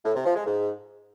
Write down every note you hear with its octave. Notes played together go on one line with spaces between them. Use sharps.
A2
C3
F3
G#3
G#2